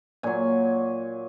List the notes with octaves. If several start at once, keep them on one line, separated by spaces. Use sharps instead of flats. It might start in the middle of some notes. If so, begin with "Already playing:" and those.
A#2 F#3 G#5